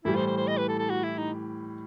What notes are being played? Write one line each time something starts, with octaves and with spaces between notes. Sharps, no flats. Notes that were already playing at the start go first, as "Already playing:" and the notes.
A2 E3 G3 E4
C5
C5
C5
D#5
B4
A4
A4
F#4
E4
D#4